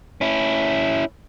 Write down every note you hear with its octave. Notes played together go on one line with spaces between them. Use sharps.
C#4 E4